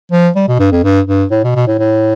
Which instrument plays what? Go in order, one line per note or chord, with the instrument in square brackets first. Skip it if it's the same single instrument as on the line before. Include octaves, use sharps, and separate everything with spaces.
[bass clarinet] F3
G3
B2
G2
F2
G2
G2
A2
B2
B2
A2
A2